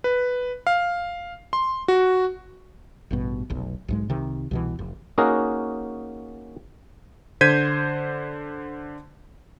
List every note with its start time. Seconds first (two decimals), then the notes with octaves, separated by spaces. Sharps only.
0.04 B4
0.67 F5
1.53 C6
1.88 F#4
3.11 A1 G2 B2
3.50 F1 B1
3.88 B1 G#2 G#3
4.09 C2 C3 D#3
4.51 C2 B2 E3
4.79 F1
5.18 A#3 C#4 D#4 F#4 G#4 A#4
7.41 D3 C5 G6 G#6 B6 D#7